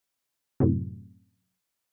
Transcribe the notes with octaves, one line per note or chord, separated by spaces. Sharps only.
F#2 A2 C3